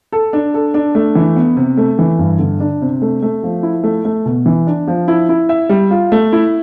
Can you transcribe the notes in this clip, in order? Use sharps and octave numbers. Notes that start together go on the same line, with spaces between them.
A4
D4
A4
D4
A3
E3
B3
C3
A3
E3
G2
D3
D4
C3
A3
A3
F3
E4
A3
A3
B2
E3
D4
F3
E4
E4
E5
G3
F4
A3
E4